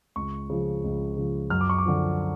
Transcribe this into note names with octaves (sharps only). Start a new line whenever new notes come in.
C#2 C#6
C#3 F3
C#2
C#3 F3
F#2 F6
D6
C#6
D6
D3 F3